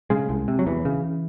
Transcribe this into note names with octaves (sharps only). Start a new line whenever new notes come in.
C#3 G#3
C2
C3
F#3
E2 E3
C#3